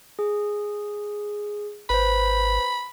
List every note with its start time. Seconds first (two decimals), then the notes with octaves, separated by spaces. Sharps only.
0.19 G#4
1.90 G#1 B4 C5 B5